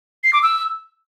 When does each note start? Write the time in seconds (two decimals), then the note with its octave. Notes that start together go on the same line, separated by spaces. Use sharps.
0.24 C7
0.33 D6
0.43 E6